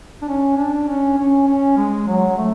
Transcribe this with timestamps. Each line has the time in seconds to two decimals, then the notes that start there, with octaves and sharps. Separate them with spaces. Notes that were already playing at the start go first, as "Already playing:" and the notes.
0.22 D4
0.28 C#4
0.57 D4
0.88 C#4
1.18 C#4
1.47 C#4
1.77 G#3
2.07 F#3
2.37 A3